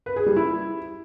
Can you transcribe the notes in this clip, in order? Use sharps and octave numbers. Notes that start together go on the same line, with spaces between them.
B4
G#4
G3
E4